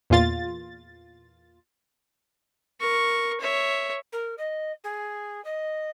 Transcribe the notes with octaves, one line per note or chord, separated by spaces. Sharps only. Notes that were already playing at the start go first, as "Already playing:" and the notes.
E2 A#2 F4 A6
A#4 C#6
C#5 E5
A#4
D#5
G#4
D#5